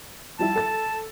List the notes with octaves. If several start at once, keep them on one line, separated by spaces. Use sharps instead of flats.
F3 G3 E4 A5
A4 A6